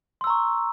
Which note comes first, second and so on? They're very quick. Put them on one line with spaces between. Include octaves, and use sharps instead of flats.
C6 E6 A#5 C#6